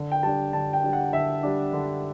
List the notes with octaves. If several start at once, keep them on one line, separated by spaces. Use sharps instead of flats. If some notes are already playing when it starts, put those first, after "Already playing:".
Already playing: D3
G5
G3 D4 A5
D3 A5
G5
G3 D4
F#5
D3 E5
G3 D4
D3